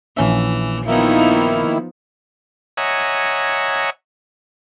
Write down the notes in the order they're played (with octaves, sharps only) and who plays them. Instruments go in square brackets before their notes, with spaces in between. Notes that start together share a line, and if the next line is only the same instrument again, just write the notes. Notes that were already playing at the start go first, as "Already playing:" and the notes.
[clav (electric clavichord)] A#1 C#4 E5 [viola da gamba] E3
[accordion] D#3 A#3 E4 [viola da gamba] F3 B3 D#4
[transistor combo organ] C#5 D#5 E5 F#5 G#5 A#5